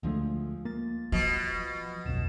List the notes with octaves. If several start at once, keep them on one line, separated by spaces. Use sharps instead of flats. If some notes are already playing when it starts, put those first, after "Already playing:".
D2 D3 F3 G#3 A3
A#3 A6
B2 F3 A5
D1 B1 F2 E7